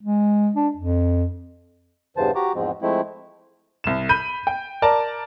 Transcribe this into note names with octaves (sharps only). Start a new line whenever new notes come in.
G#3
D4
F2
E2 G2 C#3 E3 C5 A5
F#4 G4 A#5 D6
E2 G#2 F3 G#3 C4
F3 G#3 A3 C4 E4
C2 E7
B5 G6 D#7
G5
A#4 D5 A5 A#5